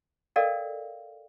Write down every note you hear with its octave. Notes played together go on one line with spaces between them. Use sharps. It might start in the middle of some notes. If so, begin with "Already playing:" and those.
A4 A#4 D5 D#5 F5 G5